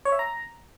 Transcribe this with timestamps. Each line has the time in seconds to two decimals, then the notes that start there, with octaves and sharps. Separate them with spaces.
0.05 C#5
0.12 E5
0.19 A#5